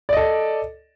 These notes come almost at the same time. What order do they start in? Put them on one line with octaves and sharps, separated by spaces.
D5 D#5 A4